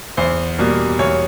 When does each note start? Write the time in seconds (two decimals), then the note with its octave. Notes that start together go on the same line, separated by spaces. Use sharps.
0.17 E2 C5
0.58 B2 G3 A#3
0.99 E2 C#5